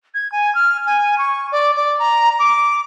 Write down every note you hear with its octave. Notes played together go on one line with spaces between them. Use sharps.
G#6
G#5
F6
G#5
C#6
D5
D5
A#5
D6